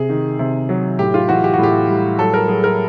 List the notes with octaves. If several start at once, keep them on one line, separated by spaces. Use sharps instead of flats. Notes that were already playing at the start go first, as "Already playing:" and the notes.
Already playing: C3 G#4
D#3
C3
F#3
A2 G4
F4
E3 F#4
G4
F#4
A2
G4
G3
F#3 A4
A#4
F#3 G#4
A#4